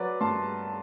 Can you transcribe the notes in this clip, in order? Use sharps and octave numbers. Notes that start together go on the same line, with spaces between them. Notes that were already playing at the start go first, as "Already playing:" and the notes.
Already playing: F#3 B4 D5
G2 A5 C6